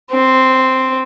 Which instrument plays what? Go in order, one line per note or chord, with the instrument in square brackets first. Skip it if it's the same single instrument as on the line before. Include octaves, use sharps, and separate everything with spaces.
[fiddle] C4